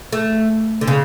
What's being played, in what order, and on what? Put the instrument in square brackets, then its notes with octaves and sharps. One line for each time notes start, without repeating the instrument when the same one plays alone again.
[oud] A3
D3
C#3